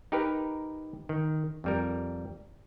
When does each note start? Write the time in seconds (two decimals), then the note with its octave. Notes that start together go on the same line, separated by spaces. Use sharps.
0.12 D#4 G4 A#4 B4
1.09 D#3
1.64 F2 G3 A#4